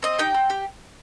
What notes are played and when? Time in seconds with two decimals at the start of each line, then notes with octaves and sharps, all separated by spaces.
0.03 C4 D#5
0.18 D#4 G4 G5
0.34 C4
0.50 G4